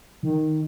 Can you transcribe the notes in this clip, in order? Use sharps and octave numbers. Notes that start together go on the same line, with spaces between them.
D#3